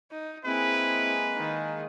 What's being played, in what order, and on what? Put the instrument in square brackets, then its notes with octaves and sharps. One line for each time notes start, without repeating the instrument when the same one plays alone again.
[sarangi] D#4
[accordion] G#3 A#3 G#4 [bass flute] C4 [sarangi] E4 [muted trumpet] B4
[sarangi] D#3